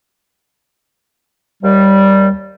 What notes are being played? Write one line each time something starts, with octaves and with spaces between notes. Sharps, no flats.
D#2 G3